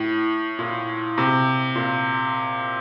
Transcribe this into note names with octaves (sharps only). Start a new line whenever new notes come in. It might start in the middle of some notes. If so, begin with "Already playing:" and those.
Already playing: A2
A#2
C3
A#2